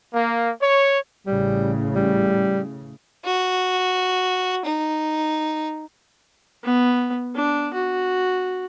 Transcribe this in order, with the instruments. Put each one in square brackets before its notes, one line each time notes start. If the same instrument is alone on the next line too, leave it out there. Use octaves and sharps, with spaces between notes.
[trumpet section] A#3
C#5
[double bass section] A1 A2 C#3 [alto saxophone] G3
[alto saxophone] G3
[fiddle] F#4
D#4
[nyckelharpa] B3
D4
F#4